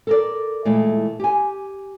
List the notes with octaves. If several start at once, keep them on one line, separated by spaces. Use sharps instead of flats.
A4 A#4 D5
A#2 E3 G#3 A3
G4 G#5